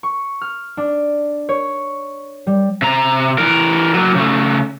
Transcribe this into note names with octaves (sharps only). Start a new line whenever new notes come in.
C#6
F6
D4
C#5
G3
C3 A#5
E3 A#4
F#3 A#3
C#3 A3